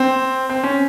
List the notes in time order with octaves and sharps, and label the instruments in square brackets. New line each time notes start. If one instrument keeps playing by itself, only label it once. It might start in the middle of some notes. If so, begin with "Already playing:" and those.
Already playing: [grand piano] C4
C4
C#4